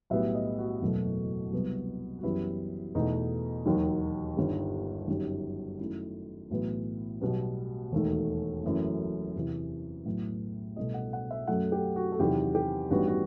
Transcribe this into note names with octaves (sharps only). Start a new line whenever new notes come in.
B1 A2 G3 B3 E5
D#5
F#4
F#1 E2 B2 F#3 A3
C2 C3 F#3 B3
F#4
F#1 F#2 E3 G3 B3 E4
E2 B2 A3 D#4
E1 D#2 D#3 F#3
G1 G2 D#3 G3
G1 F#2 D#3 G3
F#2 D#3 A3 E4
B1 A2 E3 B3
B1 B2 G3 B3
E1 D#2 D#3 A3
F#1 F#2 E3 A3
E2 C3 E3
B1 A2 F#3 B3
C2 B2 A3 D#5
F#5
F#5
E5
F#2 F#3 A3 F#5
G4
F#4
A4
E2 C3 D#3 F#3 G4
G4
A1 G2 D#3 G3 B3 F#4
F#4